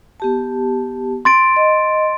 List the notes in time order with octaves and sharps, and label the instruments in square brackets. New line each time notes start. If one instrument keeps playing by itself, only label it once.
[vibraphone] B3 G4 A5
[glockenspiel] C6 A6 D7
[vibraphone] D#5